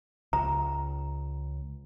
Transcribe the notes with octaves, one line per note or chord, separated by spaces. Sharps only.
C#2 A#5